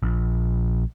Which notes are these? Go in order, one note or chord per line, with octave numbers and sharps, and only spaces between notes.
A#1